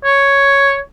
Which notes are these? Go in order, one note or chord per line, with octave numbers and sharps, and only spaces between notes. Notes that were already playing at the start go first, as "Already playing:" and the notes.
C#5